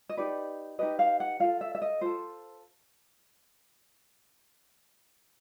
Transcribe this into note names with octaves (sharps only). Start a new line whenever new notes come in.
D#5
D#4 G4 B4 D5
D#4 G4 B4 D#5
F5
F#5
F4 A4 F5
E5
E5
D#5
F4 A4 C5